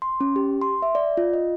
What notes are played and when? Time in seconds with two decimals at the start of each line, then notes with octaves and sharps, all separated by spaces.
0.02 C6
0.21 C#4
0.36 G4
0.61 C6
0.82 E5
0.95 D5
1.17 F4
1.33 D#5